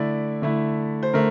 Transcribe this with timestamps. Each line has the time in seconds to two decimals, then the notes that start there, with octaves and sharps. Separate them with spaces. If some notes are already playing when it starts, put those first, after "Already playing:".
Already playing: D3 A3 E4 D5
0.42 D3 A3 E4
1.03 C5
1.13 D3 A3 A#4